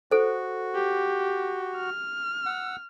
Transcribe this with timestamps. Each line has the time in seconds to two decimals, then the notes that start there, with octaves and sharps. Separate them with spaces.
0.11 F#4 A4 C5
0.75 G4
1.76 F6
2.46 F#5 E6